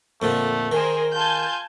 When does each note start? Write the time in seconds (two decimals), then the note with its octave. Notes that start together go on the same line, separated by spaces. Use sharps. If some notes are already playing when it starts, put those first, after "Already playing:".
0.22 F2 A#2 D3 A3
0.72 D#3 G#4 A#4 C5
1.14 F4 G#5 A5 G6